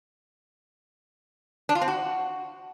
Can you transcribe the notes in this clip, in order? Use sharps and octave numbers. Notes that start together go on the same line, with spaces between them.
D4
F4
C4
F#4